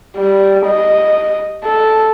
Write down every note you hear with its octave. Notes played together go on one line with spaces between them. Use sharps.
G3
D#5
A4